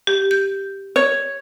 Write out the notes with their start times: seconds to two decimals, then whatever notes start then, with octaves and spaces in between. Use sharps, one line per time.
0.07 G4
0.31 G6
0.96 C#5